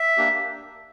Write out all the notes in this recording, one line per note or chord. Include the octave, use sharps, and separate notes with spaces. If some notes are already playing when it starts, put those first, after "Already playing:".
Already playing: E5
A#3 D4 G4